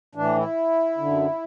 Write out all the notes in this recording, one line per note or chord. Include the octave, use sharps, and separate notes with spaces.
A2 E3 D4
E4
F#2 D3